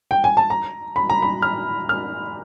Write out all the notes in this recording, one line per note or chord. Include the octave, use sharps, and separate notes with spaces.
G5
G#5
A5
A#5
B5
A#5
B5
F6
F6